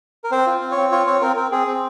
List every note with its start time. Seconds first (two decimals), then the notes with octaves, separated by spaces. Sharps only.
0.24 A#4
0.31 C4 C5
0.47 F4
0.61 C4
0.71 C#5
0.77 C4
0.91 F4 C#5
1.07 C4 C#5
1.22 C4 A#4
1.36 C4 A#4
1.52 C4 G#4
1.67 C4